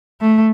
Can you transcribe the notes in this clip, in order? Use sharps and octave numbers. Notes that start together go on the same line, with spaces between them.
A3